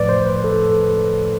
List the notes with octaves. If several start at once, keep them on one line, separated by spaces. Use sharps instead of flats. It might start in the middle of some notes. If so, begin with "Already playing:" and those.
Already playing: A2 F3 A3 B4 D5
C5
B4
A4
A4
B4